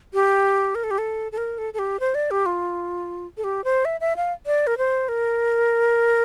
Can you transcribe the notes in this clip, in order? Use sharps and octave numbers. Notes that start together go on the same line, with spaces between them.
G4
A#4
A4
G4
A4
A4
A#4
A4
A4
G4
C5
D5
G4
F4
A4
G4
C5
E5
E5
F5
D5
A#4
C5
A#4